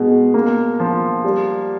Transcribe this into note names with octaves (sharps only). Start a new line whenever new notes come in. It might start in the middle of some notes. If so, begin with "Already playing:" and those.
Already playing: B2 G#3
A#3
F3
G3